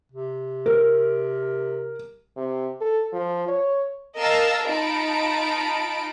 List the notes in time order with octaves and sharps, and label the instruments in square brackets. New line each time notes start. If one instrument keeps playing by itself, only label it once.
[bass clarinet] C3
[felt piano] A#4
[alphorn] C3
A4
F3
C#5
[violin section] A#4 D#5 F5 A5 E6
D#4 F4 A5 B5 D7